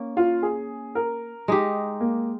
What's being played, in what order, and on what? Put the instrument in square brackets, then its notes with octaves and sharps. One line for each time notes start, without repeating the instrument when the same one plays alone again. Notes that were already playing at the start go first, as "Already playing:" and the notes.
Already playing: [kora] A#3 C#4
[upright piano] F4
G#4
A#4
[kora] G#3 D#4 G4
[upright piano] A#3